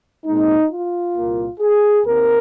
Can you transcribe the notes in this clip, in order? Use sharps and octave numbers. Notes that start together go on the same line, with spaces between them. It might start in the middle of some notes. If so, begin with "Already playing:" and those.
A#2 G#3 C4 D#4
F4
C2 A#2 A#3
G#4
D#2 D#3 C4 A#4